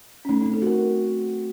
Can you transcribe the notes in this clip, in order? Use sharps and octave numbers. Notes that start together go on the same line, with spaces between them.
C#4
A3 D#4
D#4
C4
A4
F#4 A#4